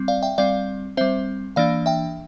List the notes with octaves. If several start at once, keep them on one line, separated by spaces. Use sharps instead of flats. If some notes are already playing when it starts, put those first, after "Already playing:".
Already playing: G3 C4
D5 F5
E5 G5
G3 C4 D5 F5
G3 C4 C5 E5
E3 A#3 D4 D5 F5
E5 G5